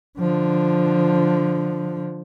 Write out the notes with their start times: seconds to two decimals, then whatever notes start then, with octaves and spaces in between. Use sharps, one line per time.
0.19 D3 F3